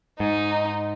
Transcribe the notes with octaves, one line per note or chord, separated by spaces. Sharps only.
G#2 D#4